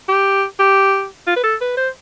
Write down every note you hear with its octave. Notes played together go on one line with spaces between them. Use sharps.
G4
G4
F4
B4
A4
B4
C5